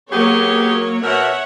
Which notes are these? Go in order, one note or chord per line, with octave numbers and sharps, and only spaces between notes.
F#3 A#3 B3 G4 G#4 C#5
B2 A#4 C#5 E5 F#5